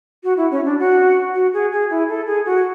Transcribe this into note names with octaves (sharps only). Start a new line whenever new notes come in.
F#4
E4
C#4
D4
F#4
F#4
G#4
G#4
E4
A4
G#4
F#4